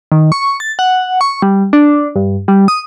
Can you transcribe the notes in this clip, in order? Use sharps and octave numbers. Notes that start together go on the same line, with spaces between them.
D#3
C#6
A6
F#5
C#6
G3
D4
G2
G3
D#6